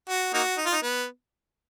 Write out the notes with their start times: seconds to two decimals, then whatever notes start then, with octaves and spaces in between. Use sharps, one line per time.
0.09 F#4
0.33 A#3 D#4 F#4
0.58 D#4
0.66 F4
0.72 D#4
0.83 B3